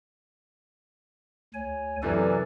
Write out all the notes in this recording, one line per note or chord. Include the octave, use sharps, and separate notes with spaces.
D2 C#5 G#5
F#2 C3 E3 A4 B4 D5